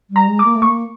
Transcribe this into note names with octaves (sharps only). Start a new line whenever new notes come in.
G3
A#5
G#3
D6
A#3
A3
A#3 C#6